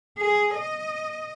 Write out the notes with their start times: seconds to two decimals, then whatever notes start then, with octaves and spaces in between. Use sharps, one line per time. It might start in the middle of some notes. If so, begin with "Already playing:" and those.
0.18 G#4
0.55 D#5